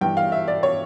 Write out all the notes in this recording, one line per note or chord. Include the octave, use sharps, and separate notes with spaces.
G2 E3 G5
F5
E5
D5
C#5